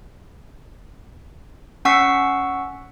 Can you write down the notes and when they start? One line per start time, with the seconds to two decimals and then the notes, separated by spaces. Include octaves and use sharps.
1.85 C#4 F#5 C#6 E6 B6 C7